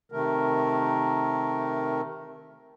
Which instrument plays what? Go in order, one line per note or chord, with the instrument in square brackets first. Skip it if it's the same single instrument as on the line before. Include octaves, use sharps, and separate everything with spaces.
[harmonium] C3 D#3 A3 A#4